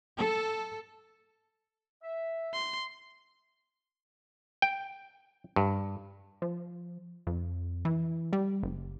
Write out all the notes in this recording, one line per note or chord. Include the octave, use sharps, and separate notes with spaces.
A4
E5
C6
G5
G2
F3
F2
E3
G3
F#1